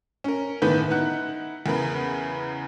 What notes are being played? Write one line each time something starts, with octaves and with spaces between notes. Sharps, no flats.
C#4 A#4
G1 A2 D#3 B3 B4 G6
D#4 E4 F#5 F#6
E2 C#3 A#4 B4